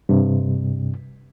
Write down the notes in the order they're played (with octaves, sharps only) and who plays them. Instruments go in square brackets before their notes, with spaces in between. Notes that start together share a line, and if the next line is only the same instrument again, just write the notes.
[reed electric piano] G2 C3